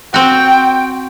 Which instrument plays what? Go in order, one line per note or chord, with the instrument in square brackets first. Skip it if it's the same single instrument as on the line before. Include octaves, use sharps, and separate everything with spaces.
[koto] C4 F#4 [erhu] G5